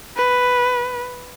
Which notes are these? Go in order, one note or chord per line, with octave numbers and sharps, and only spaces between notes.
B4